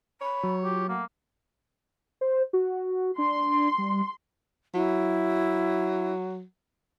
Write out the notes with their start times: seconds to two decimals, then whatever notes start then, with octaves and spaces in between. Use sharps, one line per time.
0.21 C#5 B5
0.43 F#3
0.65 F4 G4
0.89 A3 A#3 F#5
2.21 C5
2.53 F#4
3.18 D4 C6
3.78 G3
4.75 F#3 E4